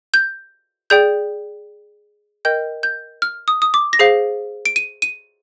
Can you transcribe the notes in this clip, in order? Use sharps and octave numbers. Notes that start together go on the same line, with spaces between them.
G6
G#4 D5 G5 G6
A#4 D#5 G5 G6
G6
F6
D#6
D#6
D6
A#6
G#4 C5 F5 C7
D7
D#7
D#7